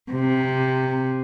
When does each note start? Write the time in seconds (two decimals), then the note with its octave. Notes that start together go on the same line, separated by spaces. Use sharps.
0.12 C3